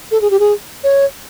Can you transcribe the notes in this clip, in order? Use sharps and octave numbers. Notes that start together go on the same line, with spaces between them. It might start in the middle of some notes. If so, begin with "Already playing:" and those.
A4
G#4
G4
G#4
C#5